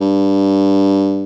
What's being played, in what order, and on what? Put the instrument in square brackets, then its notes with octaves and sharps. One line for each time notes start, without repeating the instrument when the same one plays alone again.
[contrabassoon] G2